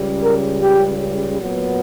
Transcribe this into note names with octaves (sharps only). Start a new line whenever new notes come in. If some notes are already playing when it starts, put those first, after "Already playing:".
Already playing: C#2 C#3 G3
A#4
G4
A#2 F#3 B3